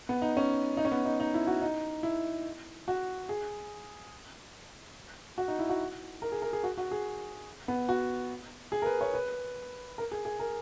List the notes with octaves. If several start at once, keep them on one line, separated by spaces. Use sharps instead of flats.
B3
D#4
C#4
D#4
C#4
B3
D#4
D#4
E4
F#4
D#4
E4
F#4
G#4
F#4
D#4
E4
F#4
A#4
G#4
A#4
G#4
F#4
F#4
G#4
B3
F#4
G#4
A#4
B4
C#5
B4
A#4
G#4
G#4
A#4